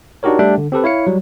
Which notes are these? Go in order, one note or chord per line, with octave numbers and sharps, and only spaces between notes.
D4 D#4 F#4 G4 A#4 C#5
G3 A3 D4 G4 E5 G5
D3
C4 G4 A4 B4
E4 C#5 F5 C#7
F#3 G3